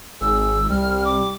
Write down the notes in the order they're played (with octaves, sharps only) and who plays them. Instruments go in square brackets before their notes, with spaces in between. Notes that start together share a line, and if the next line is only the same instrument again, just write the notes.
[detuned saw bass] G#1 [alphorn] G#4 [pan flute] E6
[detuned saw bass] C2 [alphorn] G3 [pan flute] F6
[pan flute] D6